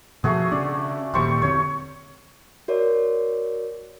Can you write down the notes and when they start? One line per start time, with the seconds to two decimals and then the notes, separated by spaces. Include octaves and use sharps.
0.24 B2 F3 A3 F#4 G#4
0.52 C#3 C#4 D4 D5
1.14 D#1 D#2 A#2 G3 C5 C#6
1.42 E2 D3 C4 C#5
2.68 F#4 A#4 C#5 D5